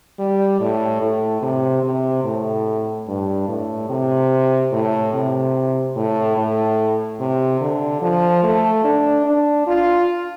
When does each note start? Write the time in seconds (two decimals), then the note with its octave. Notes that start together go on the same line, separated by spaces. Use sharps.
0.19 G3
0.60 A2
1.01 A2
1.42 C3
1.83 C3
2.24 A2
3.08 G2
3.48 A2
3.89 C3
4.72 A2
5.13 C3
5.96 A2
6.37 A2
7.20 C3
7.61 D3
8.02 F3
8.43 A3
8.84 D4
9.26 D4
9.67 F4